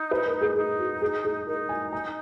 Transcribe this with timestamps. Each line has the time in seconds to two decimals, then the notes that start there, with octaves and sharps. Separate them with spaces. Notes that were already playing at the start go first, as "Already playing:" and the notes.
Already playing: D#4
0.11 B4
0.26 A#4
0.41 G#4
0.56 D#4 G#4
0.79 F#4
1.01 G#4
1.24 G#4
1.47 D#4 A#4
1.69 G#5
1.93 A#5